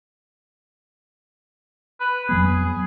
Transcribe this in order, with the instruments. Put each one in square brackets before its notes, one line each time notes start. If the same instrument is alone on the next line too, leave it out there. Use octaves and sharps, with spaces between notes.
[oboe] B4
[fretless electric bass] F2 F#3 B3 [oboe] G#4